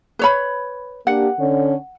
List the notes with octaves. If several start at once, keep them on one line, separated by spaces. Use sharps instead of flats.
B4 C#5 B5
A#3 D4 G4 F#5
D3 C#4